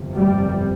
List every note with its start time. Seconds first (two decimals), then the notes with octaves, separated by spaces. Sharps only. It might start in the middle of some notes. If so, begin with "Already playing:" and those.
Already playing: G1 F2 C3
0.17 G3